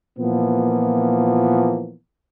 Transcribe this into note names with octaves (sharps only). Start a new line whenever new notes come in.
A#2 E3 F3 A#3 B3